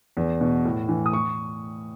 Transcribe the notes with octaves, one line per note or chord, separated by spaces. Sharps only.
E2
B2
A2
E3
D#6
C#6